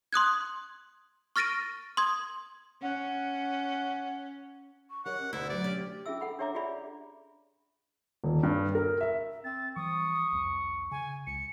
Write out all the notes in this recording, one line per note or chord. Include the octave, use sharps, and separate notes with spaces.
C6 D#6 F#6 G#6
C#6 F6 A6 A#6 D7 D#7
C6 D#6 G#6
C#4 F#5
C#6
G4 A#4 C#5 D#5 F#5
C#4
D2 B2 E4 F#5
F#3 G4 D5 E5
C#4 G4
C#4 F4 G#4 E5 E6
A4 F#5 B5
D4 G4 C#5 E5 A#5 D6
F4 G4 G#4 D5 E5 B5
D#1
G2
A#4
E5
C4 A6
E3 F3 G3 C#6 D#6
C2 F2
C#3 G#5
C#2 C#7